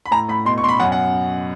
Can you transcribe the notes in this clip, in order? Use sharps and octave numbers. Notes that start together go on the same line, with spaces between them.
B5
A2 A#5
A2 B5
B2 C6
C#6
B2 C6
B5
F#2 F#5
F#5